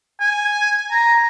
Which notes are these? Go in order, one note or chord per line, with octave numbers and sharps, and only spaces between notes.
G#5
A#5